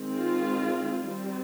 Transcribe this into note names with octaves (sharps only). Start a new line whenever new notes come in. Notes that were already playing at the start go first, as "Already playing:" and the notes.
Already playing: D#3 G#3 C4
F4
G3 C4